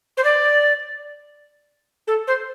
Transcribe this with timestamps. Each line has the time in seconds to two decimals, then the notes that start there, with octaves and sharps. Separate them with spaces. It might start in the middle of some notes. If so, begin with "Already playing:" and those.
0.17 C5
0.24 D5
2.07 A4
2.27 C5